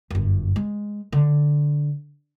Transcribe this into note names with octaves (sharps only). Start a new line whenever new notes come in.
G1 F#2
G#3
D3